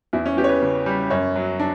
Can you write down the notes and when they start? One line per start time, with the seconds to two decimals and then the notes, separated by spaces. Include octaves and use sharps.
0.13 E2 E4
0.26 C#4
0.37 E3 G4
0.44 C#5
0.49 B4
0.62 C#3
0.86 G3
1.10 F#2 C#5
1.36 F#3
1.60 D4